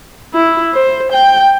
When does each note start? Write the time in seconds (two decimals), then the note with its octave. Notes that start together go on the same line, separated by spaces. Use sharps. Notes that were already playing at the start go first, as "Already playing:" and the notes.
0.34 E4
0.73 C5
1.12 G5